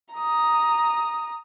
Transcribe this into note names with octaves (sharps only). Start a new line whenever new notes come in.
A#5 D#6